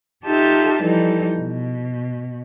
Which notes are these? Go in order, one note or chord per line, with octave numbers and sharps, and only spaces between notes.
D#4 F4 G4 A4 E5 A5
E3 F3 G3 D#4 A4
B2